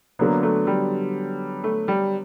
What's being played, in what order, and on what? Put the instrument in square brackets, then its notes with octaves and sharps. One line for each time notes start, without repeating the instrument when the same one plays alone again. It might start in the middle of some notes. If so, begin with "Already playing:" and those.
[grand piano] D3 F#3 B3 [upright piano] A#3
[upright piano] A3
G3
A3
G3